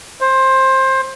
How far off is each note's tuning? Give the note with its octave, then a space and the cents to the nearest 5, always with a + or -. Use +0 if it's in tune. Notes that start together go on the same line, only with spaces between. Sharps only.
C5 +20